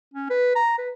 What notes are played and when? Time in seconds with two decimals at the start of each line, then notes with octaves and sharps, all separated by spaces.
0.14 C#4
0.30 B4
0.56 A#5
0.78 B4